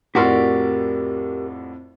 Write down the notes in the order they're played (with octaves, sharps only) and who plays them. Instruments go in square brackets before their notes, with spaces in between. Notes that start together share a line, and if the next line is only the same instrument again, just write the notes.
[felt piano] F2 A2 [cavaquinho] F#4 D5 C6 [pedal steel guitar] G4 A#4 F6